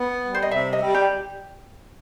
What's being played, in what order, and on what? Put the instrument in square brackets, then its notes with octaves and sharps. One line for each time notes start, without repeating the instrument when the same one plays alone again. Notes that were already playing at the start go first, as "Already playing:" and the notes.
Already playing: [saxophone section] B3 [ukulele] F#5
[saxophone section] G3
[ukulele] C5
D#5
[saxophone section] C3 [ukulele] E5
[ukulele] D#5
[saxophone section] G3
[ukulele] G4